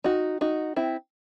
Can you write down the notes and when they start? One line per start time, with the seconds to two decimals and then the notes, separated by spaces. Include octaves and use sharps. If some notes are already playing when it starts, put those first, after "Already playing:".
0.04 D#4 F#4
0.41 D#4 F#4
0.76 C4 E4